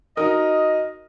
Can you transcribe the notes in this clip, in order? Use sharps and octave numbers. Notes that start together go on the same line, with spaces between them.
D#4 F#4 A#4 D#5